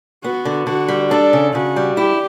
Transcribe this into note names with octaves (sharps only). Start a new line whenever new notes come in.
B3 F#4
D3
D3 F#4
G3
D4 A4
C#3
C#3 F#4
G3
E4 G4